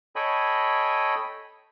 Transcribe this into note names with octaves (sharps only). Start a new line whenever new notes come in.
A4 C#5 D#5 G5 G#5 B5